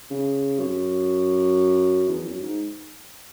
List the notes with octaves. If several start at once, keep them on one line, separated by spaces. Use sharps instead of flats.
C#3
F#2
E2
F#2
G#2